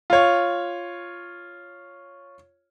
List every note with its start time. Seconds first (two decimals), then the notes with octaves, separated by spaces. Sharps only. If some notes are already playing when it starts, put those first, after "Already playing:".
0.10 F4 C#5